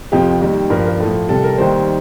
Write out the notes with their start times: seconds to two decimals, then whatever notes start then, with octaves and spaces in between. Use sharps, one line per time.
0.12 F2 C3 F3 G4
0.41 D#2 D#3 G3
0.70 G2 F3 A#4
0.86 A#4
1.00 A2 F3 A4
1.29 C2 C3 G3 A4
1.44 A#4
1.58 D#2 D#3 G3 C5